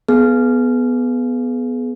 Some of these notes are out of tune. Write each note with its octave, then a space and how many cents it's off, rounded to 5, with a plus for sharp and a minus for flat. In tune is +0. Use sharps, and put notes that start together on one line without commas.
B3 +0 G#4 +25